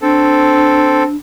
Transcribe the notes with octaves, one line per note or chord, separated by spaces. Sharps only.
C4 D4 A4